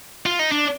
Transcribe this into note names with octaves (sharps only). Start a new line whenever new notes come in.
F4
D#4
D4